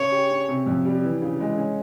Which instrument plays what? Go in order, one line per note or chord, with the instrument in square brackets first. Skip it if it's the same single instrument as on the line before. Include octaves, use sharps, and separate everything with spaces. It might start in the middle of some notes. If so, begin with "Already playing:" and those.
Already playing: [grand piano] C#3 [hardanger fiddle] C#5
[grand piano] G4
C#4
C3
F2
G3
E3
C#3
G#3
C#4